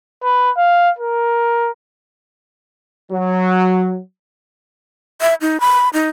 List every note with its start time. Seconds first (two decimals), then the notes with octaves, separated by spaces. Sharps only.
0.23 B4
0.57 F5
0.99 A#4
3.11 F#3
5.21 E5
5.41 D#4
5.60 B5
5.93 D#4